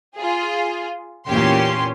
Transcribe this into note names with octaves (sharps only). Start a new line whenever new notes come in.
F4 G#4
E2 A#2 C#4 G4 C6